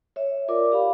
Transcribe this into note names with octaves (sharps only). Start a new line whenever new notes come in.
C#5 E5
F4 A#4 D5 D6
G4 F5 B5